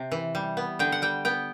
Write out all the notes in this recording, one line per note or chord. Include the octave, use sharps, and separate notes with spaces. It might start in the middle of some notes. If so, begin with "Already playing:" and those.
Already playing: C3
E3
G3
B3
D3 G5
F#5
G3 G5
B3 G5